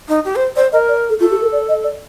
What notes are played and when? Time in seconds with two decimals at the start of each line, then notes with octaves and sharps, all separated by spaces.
0.08 D#4
0.25 G4
0.36 C5
0.56 C5 D5
0.72 A#4 D#5
0.88 D5
1.10 A4
1.20 F4 A4
1.31 G4
1.42 A#4
1.52 D5
1.69 D#5
1.84 D5